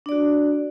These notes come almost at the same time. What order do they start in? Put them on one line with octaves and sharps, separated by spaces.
D4 D5 F#4